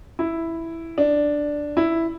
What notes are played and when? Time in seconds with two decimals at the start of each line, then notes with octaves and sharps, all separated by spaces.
0.19 E4
0.98 D4
1.77 E4